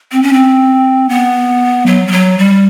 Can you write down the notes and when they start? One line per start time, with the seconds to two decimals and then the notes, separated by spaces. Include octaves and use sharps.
0.12 C4
0.23 C#4
0.33 C4
1.09 B3
1.86 F#3
2.07 G3
2.12 F#3
2.38 G3